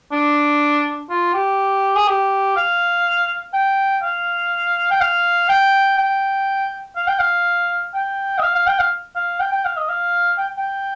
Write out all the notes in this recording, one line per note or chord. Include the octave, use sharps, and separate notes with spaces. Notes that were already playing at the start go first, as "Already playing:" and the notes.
D4
F4
G4
G#4
G4
F5
G5
F5
G5
F5
G5
G5
F5
G5
F5
G5
D#5
F5
F5
G5
F5
F5
G5
G5
F5
D#5
F5
G5
G5